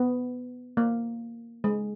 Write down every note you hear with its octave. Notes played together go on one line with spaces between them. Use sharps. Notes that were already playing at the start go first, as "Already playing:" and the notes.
Already playing: B3
A#3
G#3